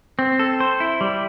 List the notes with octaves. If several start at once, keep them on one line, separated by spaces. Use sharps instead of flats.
C4
A4
C5
E4
G3